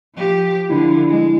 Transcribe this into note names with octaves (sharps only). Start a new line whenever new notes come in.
F3 G4
D3 F3 E4
G#3